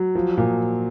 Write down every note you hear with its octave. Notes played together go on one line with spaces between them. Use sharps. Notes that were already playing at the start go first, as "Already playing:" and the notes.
Already playing: F#3
F3
A#2